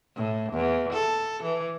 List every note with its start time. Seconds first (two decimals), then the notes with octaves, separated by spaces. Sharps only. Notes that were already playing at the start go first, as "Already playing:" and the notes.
0.16 A2
0.53 E2
0.93 A4
1.43 E3